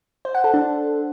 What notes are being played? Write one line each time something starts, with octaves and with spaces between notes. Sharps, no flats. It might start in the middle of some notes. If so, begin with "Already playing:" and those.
C5
F#5
A4
D4